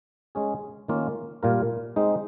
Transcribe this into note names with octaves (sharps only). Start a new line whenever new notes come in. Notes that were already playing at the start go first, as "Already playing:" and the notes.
G#3 C#4 G#4
D#3 A#3 C#4 F4
A#2 G3 A#3 F4 A#4
G#3 C4 D#4